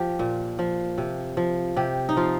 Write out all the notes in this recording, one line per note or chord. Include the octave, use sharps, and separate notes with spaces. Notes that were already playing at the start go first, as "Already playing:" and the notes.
Already playing: F3 G4
A#2
F3
C3
F3
C3 G4
D#4
F3 F4